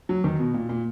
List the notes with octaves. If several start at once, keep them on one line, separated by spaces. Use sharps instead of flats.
F#3
D#3
B2
A#2
A#2